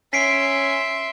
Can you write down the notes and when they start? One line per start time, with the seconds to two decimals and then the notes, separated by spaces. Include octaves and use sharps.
0.13 C#4 E5 C6 B6 C7 D7